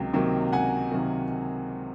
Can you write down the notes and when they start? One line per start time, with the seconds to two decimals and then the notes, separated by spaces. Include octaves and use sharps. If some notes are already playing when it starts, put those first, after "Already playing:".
Already playing: C#2 C3 D#3 F#3 A#3 G5
0.13 C3 D#3 F#3 A#3
0.52 C#2 F#5 G#5
0.92 C3 D#3 F#3 A#3